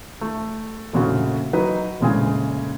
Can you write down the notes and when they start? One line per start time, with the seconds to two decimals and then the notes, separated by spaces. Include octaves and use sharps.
0.21 A3
0.93 F1 A#1 C#3 F#4
1.53 F#3 D#4 B4
2.01 F1 A#1 C#3 G#3 G#5